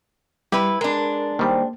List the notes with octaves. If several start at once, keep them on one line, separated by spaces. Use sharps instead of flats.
G3 E4 G4 B4
G#3 D4 A#4
D#3 G3 A#3 C5 G5